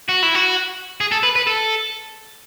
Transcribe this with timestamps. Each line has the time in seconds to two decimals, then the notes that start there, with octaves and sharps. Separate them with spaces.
0.09 F#4
0.23 E4
0.35 F#4
1.01 G#4
1.12 A4
1.23 B4
1.36 B4
1.47 A4